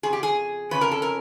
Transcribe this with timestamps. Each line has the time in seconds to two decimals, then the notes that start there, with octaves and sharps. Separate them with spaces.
0.03 F2 C#3 G#4
0.13 G4
0.23 G#4
0.71 F2 C#3 C#4 B4
0.81 A#4
0.91 A4
1.02 A#4